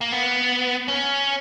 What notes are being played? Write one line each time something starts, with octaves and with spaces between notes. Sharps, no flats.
A#3
B3
C#4